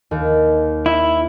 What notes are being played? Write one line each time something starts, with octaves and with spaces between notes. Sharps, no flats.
D#2
E4